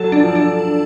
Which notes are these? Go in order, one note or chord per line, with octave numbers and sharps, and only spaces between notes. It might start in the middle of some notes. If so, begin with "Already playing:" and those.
Already playing: F#3 A4
D4
F3
D4